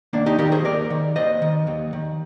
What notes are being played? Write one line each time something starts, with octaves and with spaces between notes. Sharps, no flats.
D#2 A#3 D4
D#4 G4
D#3 G4 A#4
G#4 C5
D#2 A#4 D5
D#3
D#2 C5 D#5
D#3
D#2
D#3